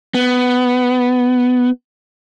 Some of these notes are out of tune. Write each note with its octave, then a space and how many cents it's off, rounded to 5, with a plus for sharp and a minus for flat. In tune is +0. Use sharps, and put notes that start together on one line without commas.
B3 +10